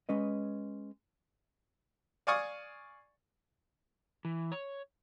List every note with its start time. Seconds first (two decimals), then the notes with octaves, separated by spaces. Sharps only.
0.09 G#3 C#4 B4 D#5
2.27 D5 F5 G#5 C#6 D#6
4.25 E3
4.52 C#5